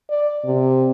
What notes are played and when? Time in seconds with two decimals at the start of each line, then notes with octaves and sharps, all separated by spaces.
0.10 D5
0.45 C3